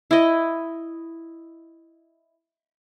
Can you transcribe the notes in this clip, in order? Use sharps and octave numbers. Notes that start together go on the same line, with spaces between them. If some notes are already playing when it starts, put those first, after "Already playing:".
E4 D#5